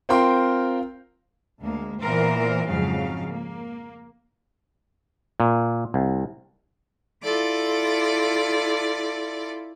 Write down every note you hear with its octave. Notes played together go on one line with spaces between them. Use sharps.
C4 F4 A#4 G5 C6
D2 G#3 A#3
A#2 E3 B3 A#4 C5
F2 G#2 C#3 F3 F#3 F5
A#3
A#2
C2
E4 F4 A4 D5 D6